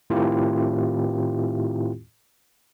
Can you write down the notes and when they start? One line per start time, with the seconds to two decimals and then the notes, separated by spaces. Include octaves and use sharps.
0.10 A2 D#3 C4 E4 F4 G4